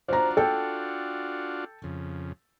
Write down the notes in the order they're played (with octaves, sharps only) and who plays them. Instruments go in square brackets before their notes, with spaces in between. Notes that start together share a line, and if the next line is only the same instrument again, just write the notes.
[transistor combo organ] D4 F4 F#4 [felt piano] C5 A#5
[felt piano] A4 G5
[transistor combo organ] F2 C#3